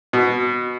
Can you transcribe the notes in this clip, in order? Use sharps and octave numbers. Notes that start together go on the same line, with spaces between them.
B2